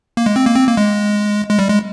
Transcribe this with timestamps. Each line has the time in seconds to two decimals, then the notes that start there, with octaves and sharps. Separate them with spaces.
0.17 A#3
0.26 G#3
0.36 C4
0.46 A#3
0.56 C4
0.67 A#3
0.77 G#3
1.49 G#3
1.59 G3
1.69 G#3